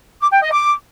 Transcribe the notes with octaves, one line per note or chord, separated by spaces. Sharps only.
D6
G5
D#5
D6